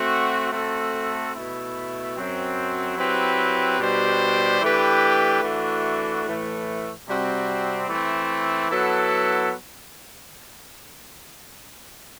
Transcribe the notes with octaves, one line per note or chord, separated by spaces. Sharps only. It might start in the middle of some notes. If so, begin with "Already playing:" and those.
Already playing: A3 C4 F#4
A3 C4 F#4 A4
B2 A3 E4
F#2 F#3 C4
F#3 C4 E4 G4 B4
B2 G3 D4 G4 C5
E3 A3 D4 G4 B4
E3 A3 D4 F#4
A2 E3 A3
C3 G3 C4 F#4
E3 A3 C4
F#3 B3 E4 A4